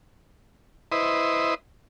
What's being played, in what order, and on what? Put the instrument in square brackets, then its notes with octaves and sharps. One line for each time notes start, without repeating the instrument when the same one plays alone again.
[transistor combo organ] E4 B4 C5 D#5